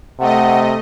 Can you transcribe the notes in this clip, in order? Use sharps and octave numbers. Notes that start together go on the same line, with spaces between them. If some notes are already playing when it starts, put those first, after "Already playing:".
C3 A3 D#5 F#5